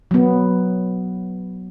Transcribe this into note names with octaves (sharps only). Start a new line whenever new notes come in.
F#3 B3